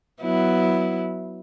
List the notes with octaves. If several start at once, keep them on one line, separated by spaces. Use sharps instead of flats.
F#3 B3 E4